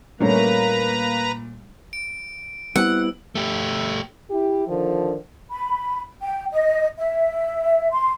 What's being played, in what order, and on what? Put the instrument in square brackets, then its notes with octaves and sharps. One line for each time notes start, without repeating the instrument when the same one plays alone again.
[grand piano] A#2 [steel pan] G3 A3 C#4 [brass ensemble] A#3 [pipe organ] B4 A#5
[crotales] D7
[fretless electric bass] G3 B3 C4 [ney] E4 [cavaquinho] F#5 [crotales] E6
[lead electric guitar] A3 G4
[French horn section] E4 G4
D3 D#3 F3
[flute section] B5
G5
D#5
E5
C6